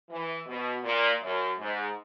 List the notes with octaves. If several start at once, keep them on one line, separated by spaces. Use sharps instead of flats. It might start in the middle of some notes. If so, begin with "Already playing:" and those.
E3
B2
A#2
F#2
G#2